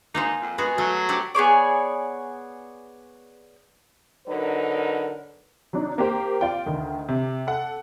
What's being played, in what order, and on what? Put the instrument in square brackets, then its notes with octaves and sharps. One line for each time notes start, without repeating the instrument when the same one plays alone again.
[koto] A#3 G#4 C5 [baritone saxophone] D#4
[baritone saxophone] F2
[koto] G#3 B3 F#4 [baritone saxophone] G#4
[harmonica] F#3 [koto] A3
[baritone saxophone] C3 [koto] G4 A4 F#5
[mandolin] B3 G#4 C#5 D5
[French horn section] D3 F#3 D#4 A#4 B4
[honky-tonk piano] F#3 D4 D#4
A#3 G4 C5
F4 D5 G5
D2 D#3
C3
A4 F#5